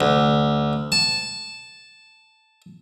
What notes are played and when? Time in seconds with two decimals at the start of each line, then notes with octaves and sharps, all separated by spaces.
0.01 D2
0.92 A5